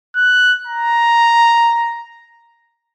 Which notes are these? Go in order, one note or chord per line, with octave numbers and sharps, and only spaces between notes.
F#6
A#5